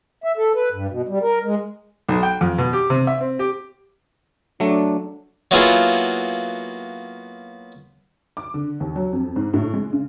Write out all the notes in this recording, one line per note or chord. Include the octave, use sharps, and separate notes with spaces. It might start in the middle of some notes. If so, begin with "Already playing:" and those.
E5
A4
B4
G2
B2
G3
A#4
G#3
B1
G5
F2
B2
G4
C3
E5
C4
G4
F#3 A3 D4
F#3 A#3 B3 E4 F4 G#4
D6
D3
D#2
F#3
F2
G#2
A2
G#3
C#3